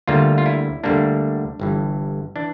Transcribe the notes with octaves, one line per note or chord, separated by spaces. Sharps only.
D2 D3 G3 A#3 F4
F4
E4
D2 D3 G3 A#3 D4
G1 G2 E3
E3 D4